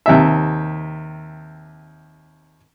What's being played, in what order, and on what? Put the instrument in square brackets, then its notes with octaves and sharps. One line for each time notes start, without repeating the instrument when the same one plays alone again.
[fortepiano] D#2 C3 E5